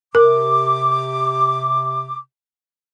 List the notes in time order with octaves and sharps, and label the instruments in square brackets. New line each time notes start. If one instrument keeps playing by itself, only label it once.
[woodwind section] C3 D6 [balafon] A#4